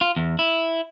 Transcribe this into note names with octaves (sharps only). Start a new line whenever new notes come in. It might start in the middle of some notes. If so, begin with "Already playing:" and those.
F4
E2
E4